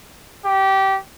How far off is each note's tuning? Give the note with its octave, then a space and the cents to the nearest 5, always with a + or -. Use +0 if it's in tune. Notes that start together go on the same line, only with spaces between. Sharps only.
G4 -20